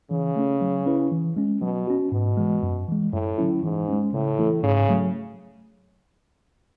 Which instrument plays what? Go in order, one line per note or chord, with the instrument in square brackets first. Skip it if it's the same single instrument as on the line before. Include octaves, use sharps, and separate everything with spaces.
[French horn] C#3 [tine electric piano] E3
[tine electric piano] A3 C#4
F#3
C#4 E4 B4
E3
G#3 C#4
[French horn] B2 [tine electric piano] F#3
[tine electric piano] C#4 F#4
[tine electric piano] G#2 [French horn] B2
[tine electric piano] E3 G#3
F#2
E3 G#3
[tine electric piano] F#2 [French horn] A2
[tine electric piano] D3 F#3 C#4 E4
[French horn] G#2 [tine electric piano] E3
[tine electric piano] G#3 C#4
[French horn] A2 [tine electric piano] C#3
[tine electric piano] E3 A3 E4 A4
[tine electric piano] G#2 [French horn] C#3
[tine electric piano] F#3 A3